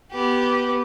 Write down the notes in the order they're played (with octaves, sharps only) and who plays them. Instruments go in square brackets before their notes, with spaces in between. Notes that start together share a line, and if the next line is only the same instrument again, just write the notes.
[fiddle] B3 G4